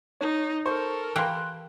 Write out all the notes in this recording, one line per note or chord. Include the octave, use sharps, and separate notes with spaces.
D#4 C#5
A4 A#4 C5 C#6
E3 A#3 G4 G5 C6 F#6